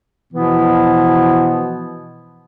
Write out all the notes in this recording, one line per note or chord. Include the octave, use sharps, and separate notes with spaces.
B2 E3 F3 B3 E4